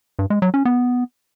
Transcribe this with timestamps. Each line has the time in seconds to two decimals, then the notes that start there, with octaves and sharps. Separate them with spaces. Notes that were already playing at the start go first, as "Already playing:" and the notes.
0.19 G2
0.30 G#3
0.42 F#3
0.54 C#4
0.65 B3